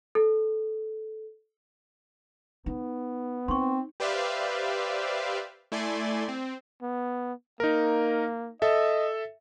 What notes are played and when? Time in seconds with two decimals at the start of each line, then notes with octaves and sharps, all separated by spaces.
0.15 A4
2.66 B3 D#4
3.48 C4 D#4 C6 C#6
4.00 G4 B4 C5 D5 E5 F5
5.72 A3 E4 D5 G#5 C6
6.28 C4
6.82 B3
7.60 A#3 D#4 A#4
8.62 A4 D#5 E5